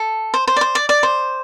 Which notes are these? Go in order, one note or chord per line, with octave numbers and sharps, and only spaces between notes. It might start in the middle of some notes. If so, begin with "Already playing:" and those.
Already playing: A4
C5
C5
D5
C5
D5
D5
C5